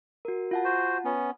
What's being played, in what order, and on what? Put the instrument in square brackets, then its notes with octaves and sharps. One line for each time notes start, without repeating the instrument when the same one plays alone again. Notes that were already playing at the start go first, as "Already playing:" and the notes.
[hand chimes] F#4 A#4
F4 F#5 A5
[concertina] F#4 C5
B3 C#4